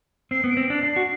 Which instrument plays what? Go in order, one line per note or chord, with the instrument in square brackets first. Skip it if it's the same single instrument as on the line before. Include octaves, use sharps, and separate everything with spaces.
[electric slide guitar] C4 [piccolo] C7
[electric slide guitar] B3
[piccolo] D7
[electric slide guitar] C4
[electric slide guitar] D4 [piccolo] C7
[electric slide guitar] D4
F#4